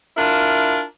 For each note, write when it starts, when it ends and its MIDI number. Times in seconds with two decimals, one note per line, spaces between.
0.17 0.80 62
0.17 0.80 64
0.17 0.80 65
0.17 0.80 70